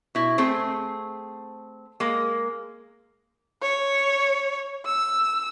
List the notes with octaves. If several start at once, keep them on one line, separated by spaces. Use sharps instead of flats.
B2 E4
A3 C4 G#4
G#3 A#3
C#5
E6